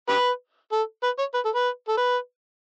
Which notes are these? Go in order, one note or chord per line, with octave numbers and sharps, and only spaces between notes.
G4 B4
A4
B4
C#5
B4
A4
B4
A4
B4